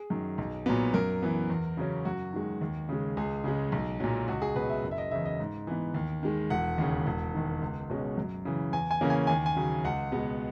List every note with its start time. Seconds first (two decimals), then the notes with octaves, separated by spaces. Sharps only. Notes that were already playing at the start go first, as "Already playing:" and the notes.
Already playing: G#4
0.10 F#2 D#3
0.38 B1
0.66 A#2 F#3 B3
0.94 F#2 A#4
1.22 E3 B3
1.50 E2
1.77 C#3 F#3 C#4
2.05 F#2 F#4
2.33 D#3 G#3
2.61 D#2
2.89 C#3 G#3
3.17 C#2 G#4
3.44 C#3 G#3
3.72 B1
4.00 A#2 F#3
4.28 C#2 F#4
4.42 G#4
4.55 B2 F#3 B4
4.69 E5
4.84 F#1
4.91 E5
4.98 D#5
5.11 E2 C#3 E5
5.26 D#5
5.39 G#2
5.67 E3 B3
5.94 D#2
6.23 D#3 G#3
6.50 E1 F#5
6.78 D#2 C#3
7.07 E1
7.34 D#2 D#3
7.62 C#2
7.90 B2 G#3 C#4
8.18 F#2
8.45 C#3 E3
8.73 E2 G#5
8.91 G#5
9.01 C#3 E3 A#3 C#4
9.10 G#5
9.27 D#2 G#5
9.46 G#5
9.56 C#3 F#3
9.84 C#2 F#5
10.12 B2 G#3 B3